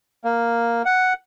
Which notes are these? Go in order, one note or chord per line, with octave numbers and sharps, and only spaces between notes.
A#3
F#5